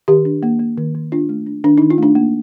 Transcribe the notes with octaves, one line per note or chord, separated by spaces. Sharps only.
D#3 G4
D4
A#3
A#3
D#3
D#3
D4 F4
A3
D4
D#3 D4
D#3 D#4
F4
A3 D4
A#3